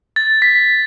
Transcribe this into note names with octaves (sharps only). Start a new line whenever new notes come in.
A6
B6